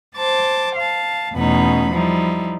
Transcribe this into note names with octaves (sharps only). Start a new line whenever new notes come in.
C5 A5 D6
F5 A5
E2 B2 A3 C#4 D#4 B5
F3 G3 D#4 E4